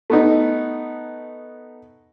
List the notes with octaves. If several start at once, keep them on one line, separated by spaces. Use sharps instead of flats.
A3 B3 D#4